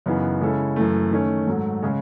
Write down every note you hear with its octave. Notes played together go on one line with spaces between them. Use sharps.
F#2 C#3 E3 B3 D#4
C#3 G#3 C#4 E4 A4
F#2 E3 A3
D#3 A3 C#4
G#2 F#3 A3
C#3 G#3 C#4